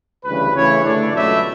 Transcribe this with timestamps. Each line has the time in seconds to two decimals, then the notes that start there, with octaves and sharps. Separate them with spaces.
0.25 D2 C#3 E3 G3 B4
0.54 C#3 E3 A3 E4 C#5
0.84 G2 D3 A3 D4 D5
1.12 C#2 B2 F#3 A3 E4 E5